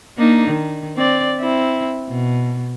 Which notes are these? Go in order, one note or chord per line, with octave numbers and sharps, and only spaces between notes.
A#3 D4 D#4
D#3
C4 D5
C4 E4
B2